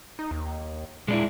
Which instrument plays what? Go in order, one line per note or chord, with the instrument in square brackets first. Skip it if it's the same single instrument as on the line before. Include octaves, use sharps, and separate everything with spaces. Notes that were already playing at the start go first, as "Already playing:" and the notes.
[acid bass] D#4
D#2
[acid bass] A#2 [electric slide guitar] G#3 D4 E4